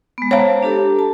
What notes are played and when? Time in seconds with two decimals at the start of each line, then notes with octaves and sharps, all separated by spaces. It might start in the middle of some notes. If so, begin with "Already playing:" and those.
0.18 G#3 B3
0.31 C5 C#5 F5 A5 A#5
0.63 D4 G4 A4
0.99 A5